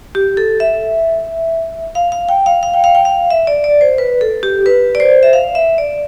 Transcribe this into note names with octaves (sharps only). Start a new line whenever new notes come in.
G4
A4
E5
F5
F5
G5
F5
F5
G5
F5
G5
F5
E5
D5
D5
C5
B4
A4
G4
B4
D5
C5
E5
F5
E5
D5